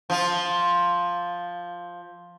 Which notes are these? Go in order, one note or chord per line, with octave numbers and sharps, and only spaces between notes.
F3 F4